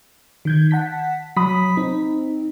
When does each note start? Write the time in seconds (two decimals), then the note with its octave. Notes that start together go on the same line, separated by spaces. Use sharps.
0.45 D#3 G6 G#6
0.71 F#5 A5 B6
1.37 F#3 B5 D#6 B6
1.77 C4 D#4